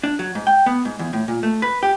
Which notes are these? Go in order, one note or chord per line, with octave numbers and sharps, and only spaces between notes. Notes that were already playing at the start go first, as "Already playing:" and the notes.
D4
F#3
G#2
G5
B3
G#2
E2
A2
A#2
A3
B4
G4